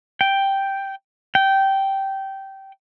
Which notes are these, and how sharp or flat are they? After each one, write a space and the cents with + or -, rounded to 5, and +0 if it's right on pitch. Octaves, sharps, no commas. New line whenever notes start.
G5 +0
G5 -15